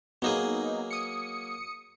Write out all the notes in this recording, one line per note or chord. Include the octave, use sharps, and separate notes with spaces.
F#3 A#3 B3 D#4 G#4
D#6 C#7